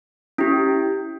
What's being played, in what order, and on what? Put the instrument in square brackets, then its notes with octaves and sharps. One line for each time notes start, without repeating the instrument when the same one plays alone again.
[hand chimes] C#4 E4 G4